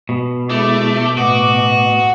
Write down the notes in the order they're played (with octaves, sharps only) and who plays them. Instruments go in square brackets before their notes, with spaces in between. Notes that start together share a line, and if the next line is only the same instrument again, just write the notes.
[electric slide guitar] B2
[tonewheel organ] G#3 E4 [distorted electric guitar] A3 [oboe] D6
[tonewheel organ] A2 B3 D#5 [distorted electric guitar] F#4